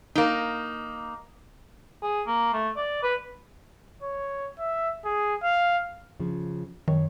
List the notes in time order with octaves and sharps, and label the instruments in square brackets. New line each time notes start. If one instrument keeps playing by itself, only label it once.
[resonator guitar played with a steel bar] A#3 D#4
[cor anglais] G#4
A#3
A3
D5
B4
[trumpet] C#5
E5
G#4
F5
[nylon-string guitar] C#3 F3
[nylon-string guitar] F#2 C#5 [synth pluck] D#3